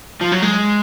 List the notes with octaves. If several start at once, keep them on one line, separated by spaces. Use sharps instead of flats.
F3
F#3
G#3